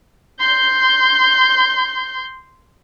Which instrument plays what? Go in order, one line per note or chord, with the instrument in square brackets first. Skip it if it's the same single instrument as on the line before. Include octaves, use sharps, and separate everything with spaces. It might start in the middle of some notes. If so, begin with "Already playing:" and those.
[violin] C6 G6